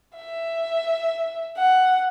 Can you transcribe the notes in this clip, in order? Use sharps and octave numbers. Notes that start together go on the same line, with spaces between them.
E5
F#5